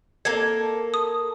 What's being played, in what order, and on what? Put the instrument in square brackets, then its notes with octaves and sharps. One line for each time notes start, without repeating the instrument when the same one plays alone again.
[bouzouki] A#3 A4 [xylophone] G#6
[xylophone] D#6